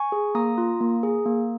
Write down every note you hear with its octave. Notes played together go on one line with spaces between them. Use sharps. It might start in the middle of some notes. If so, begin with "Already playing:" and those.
Already playing: G#5 C#6
G#4
A#3 A#5 D#6
F4
A#3
G#4
A#3